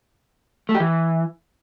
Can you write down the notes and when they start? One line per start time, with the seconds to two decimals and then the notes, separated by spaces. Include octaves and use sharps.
0.69 A3
0.74 G4
0.80 E3